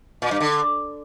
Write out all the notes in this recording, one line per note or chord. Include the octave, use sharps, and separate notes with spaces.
A#2
G2
D3